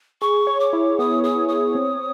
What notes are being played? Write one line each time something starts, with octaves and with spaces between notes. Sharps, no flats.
G#4 C#6
C#5
D6
E4
B3 D#6
G#4 D#6
C#5 D#6
C4